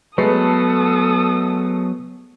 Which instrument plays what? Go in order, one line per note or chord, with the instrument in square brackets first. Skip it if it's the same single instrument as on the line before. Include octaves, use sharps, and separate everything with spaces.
[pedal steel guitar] F#3 B3 [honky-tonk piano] G#3 A3 [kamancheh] A4 D#6 [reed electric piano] B4